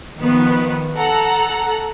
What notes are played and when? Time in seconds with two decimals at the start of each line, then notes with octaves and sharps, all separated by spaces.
0.18 D#3 F3 B3
0.97 A4 F#5 A#5